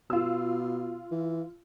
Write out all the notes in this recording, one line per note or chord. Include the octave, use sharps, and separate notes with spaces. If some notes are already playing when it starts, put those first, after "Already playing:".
B2 F4 E6
E3